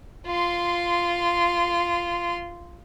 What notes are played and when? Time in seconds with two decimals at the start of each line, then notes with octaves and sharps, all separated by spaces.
0.27 F4 C6